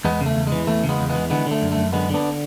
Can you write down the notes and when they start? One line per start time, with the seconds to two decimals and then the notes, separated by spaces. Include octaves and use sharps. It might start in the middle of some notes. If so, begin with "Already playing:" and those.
0.05 E2 G#3 B3
0.21 C#3
0.26 A3
0.36 E2
0.47 G#3
0.52 E3
0.67 E2 A3
0.84 C#3
0.89 G#3 B3
1.00 E2
1.09 G#3 B3
1.15 E3
1.30 D3 G#3 B3
1.46 D3 A3
1.62 F#2
1.72 A3
1.77 F#2
1.93 D3 G#3 B3
2.09 D3
2.14 B3 D4